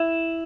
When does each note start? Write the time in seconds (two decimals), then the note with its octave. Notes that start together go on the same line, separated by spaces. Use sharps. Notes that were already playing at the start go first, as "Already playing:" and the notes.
Already playing: E4